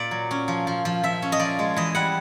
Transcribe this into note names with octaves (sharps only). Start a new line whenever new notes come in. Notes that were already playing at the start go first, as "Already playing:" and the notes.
Already playing: A#2 A#3 D5
F#3
C#4
F3
F3
F3
F3 E5
C#4
D#5
F3 D5
G#3
E3 D#5
G3 F#5